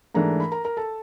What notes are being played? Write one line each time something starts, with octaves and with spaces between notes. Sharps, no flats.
G#2 E3 A3 D4 A#4 A#5
B5
A#4 A#5
A#4 A#5
A4 A5